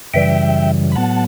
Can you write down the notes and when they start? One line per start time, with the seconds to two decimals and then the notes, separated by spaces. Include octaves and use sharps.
0.14 F#2 C#3 E3 G3 E5 G5
0.92 B5
0.95 A2 F#3 B3 F#5 A5